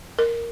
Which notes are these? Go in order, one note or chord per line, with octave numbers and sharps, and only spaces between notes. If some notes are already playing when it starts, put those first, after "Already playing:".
A#4